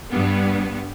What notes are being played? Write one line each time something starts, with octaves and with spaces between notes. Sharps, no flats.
G2 B3